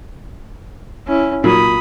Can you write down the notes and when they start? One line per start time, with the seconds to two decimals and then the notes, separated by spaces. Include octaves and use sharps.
1.07 C#4 E4
1.44 A#2 F#3 B5 D#6